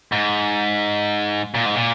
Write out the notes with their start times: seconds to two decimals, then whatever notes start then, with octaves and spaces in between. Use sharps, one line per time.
0.12 G#2
1.55 A#2
1.65 G#2
1.75 A#2